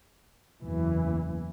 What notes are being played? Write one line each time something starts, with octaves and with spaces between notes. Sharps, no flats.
F#1 E2 E3